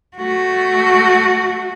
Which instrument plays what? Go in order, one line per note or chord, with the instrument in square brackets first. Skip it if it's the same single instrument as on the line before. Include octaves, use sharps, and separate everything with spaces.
[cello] A3 F#4